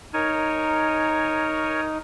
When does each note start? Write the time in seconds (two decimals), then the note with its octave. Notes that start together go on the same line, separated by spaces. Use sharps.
0.14 D#4 A#4 C#5 G#5